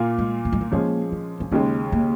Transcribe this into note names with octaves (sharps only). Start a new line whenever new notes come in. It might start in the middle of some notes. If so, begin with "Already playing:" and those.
Already playing: A#2 A#3 F4
G#3
A#3
G#3
A#3
F3 G#3 A#3 C#4 G#4
C#4
C#4
D#2 C#3 G#3 A#3
A#3